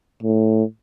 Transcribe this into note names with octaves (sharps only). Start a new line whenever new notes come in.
A2